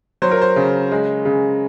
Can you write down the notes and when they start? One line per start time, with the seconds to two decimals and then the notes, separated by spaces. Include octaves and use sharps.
0.22 F#3 C5
0.31 A#4
0.41 C5
0.56 C#3
0.92 G#3
1.25 C#3